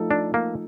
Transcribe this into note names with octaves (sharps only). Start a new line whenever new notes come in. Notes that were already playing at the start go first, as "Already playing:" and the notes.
Already playing: F3 A3 D#4 A4
D4
A#3